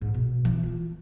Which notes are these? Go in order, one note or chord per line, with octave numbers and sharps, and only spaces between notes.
G#2
B2
E3
F4